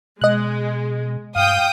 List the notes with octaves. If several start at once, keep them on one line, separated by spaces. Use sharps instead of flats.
B2 G#3 D#5 F#6
G2 F5 G5 D#6